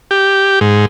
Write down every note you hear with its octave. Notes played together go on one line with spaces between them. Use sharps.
G4
G#2